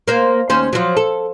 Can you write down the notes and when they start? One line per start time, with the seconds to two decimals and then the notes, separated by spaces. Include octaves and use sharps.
0.08 A#3 C5
0.50 D#2 C#4 C5
0.73 F3 F#3
0.97 A4